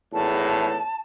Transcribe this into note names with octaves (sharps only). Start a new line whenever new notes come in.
G#1 E2 A2 A5